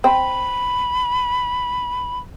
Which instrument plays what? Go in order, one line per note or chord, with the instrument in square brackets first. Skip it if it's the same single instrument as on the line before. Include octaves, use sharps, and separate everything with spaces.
[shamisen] C4 [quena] B5